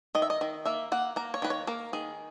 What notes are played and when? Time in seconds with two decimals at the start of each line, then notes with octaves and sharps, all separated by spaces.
0.15 D#3 D#5
0.22 E5
0.30 D#5
0.41 D#3
0.65 A#3 E5
0.92 A#3 F#5
1.16 A#3 A#5
1.34 C#5
1.42 D#3 B4
1.50 C#5
1.67 A#3 A#4
1.93 D#3 G#4